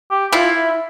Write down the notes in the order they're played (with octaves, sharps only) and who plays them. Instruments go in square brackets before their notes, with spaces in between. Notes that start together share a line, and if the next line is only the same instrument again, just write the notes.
[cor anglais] G4
[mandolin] E4 [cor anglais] F4